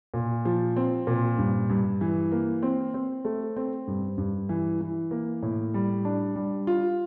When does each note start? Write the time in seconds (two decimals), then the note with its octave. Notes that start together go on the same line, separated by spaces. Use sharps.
0.14 A#2
0.45 F3
0.76 C4
1.07 A#2
1.38 G2
1.69 G2
2.01 E3
2.32 A#3
2.63 C4
2.94 C4
3.25 A3
3.56 C4
3.87 G2
4.18 G2
4.49 E3
4.81 E3
5.11 A#3
5.42 A2
5.74 G3
6.05 D4
6.36 G3
6.67 F4